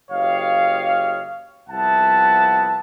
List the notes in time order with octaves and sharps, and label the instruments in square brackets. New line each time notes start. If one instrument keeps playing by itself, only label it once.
[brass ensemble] F#1 G4 C#5 D#5 F5
C2 F3 B3 E5 F#5 A5